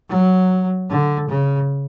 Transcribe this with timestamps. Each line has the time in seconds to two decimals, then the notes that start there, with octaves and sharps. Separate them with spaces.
0.10 F#3
0.89 D3
1.29 C#3